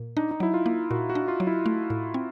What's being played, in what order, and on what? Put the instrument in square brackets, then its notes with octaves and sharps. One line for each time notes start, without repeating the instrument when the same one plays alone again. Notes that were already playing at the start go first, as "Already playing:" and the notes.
Already playing: [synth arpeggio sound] A#2
[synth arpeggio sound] D4 [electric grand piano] D#4
[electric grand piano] D#4
[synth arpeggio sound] F#3 [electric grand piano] E4
[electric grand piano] F4
[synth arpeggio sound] A#3
[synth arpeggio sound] A#2 [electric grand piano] F#4
[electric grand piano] F#4
[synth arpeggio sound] D4
[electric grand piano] F4
[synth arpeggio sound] F#3
[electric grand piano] E4
[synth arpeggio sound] A3
A2
C4